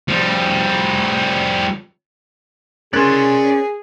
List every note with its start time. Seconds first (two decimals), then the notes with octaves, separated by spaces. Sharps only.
0.09 F3 G3
2.93 C#4 G#4 A#4 D5 C6 F#6 A6